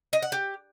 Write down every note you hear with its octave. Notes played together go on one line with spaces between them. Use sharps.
D#5
F#5
G4